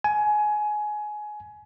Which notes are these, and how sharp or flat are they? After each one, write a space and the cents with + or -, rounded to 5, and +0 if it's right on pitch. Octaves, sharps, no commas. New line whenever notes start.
G#5 +20